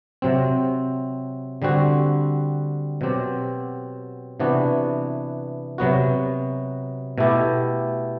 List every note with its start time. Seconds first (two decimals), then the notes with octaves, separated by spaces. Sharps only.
0.22 C3 F#3 C4
1.62 D3 G3 C4 F#4
3.01 B2 F#3 C4 G4
4.40 C3 E3 B3 D4 F#4
5.78 C3 F#3 B3 F#4
7.18 B2 A3 E4 G4